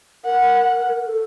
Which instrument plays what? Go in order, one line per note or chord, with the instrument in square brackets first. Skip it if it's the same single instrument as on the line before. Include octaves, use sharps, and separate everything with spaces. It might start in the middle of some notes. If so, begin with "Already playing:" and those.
[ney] A#4 [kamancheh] F#5
[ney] A4